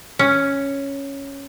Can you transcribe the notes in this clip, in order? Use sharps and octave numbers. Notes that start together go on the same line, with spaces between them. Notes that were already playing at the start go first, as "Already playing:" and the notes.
C#4